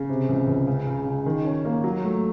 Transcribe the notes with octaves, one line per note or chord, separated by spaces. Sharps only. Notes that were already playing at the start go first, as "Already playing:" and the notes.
Already playing: C#3
C3
C#2
C#2
C#3
C#3
C#3
D#3
C#4
A#3
F#3
A3